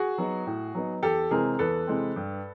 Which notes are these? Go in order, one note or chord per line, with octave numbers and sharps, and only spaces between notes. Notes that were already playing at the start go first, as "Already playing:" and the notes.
Already playing: F#4 G#4
F#3 B3 D#4
A2
F#3 B3 D#4
E2 G4 A4
C3 E3 G#3 C4 G#4 A#4
E2 A4 B4
C3 E3 G#3 C4
G2